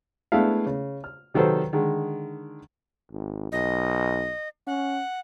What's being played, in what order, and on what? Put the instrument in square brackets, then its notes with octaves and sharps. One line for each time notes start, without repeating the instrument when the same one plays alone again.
[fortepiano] G#3 A3 B3 D4 E4 F5
C#3
F6
C3 D#3 F#3 A4 B4 C5
D3 D#3 G#3
[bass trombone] G#1
[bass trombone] B1 [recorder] D#5
[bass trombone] C#4 [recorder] F#5